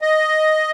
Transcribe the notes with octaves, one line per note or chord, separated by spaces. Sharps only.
D#5